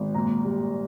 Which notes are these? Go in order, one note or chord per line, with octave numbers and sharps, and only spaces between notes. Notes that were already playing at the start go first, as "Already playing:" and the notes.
Already playing: G#1
A#2 A#5
G3